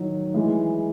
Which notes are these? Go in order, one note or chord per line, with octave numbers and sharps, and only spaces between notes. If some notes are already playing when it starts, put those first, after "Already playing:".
Already playing: D#3 F#3
E3 G#3